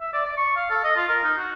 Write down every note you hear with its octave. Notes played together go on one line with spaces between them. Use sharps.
E5
D5
D5
C#6
F5
A4
D#5
F4
A#4
D#4
F#4